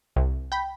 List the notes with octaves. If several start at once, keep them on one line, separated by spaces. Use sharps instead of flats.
C2
G5 B5